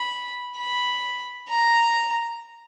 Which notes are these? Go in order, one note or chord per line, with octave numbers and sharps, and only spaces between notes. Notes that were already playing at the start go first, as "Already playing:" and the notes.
Already playing: B5
B5
A#5